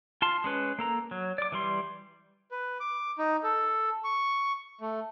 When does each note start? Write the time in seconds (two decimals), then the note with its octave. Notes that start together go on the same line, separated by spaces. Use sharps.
0.22 F4 A5 C6
0.44 G#3 C#4 B4
0.79 A#3 A4 A#5
1.11 F#3
1.38 D5 D6
1.52 E3 G3 C6
2.51 B4
2.80 D6
3.18 D#4
3.43 A4
4.04 C#6
4.81 A3